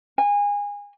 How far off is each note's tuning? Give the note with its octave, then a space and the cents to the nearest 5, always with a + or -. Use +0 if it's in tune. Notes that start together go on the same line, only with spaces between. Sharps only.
G#5 -25